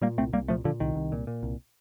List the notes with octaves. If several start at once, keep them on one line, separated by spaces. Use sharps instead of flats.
A#2 G3 A#3
C2 A3 C4
C2 G3 A#3
A#2 F3 A3
A#2 D3 F3
C2 D#3
C2
A#2
A#2
C2